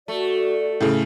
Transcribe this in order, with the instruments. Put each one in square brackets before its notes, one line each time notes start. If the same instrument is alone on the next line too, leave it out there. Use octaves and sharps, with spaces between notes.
[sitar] A3 [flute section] F#4 D5
[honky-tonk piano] A2 C#3